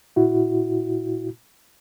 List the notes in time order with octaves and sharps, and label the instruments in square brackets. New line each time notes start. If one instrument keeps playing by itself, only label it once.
[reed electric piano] A#2 E4 F#4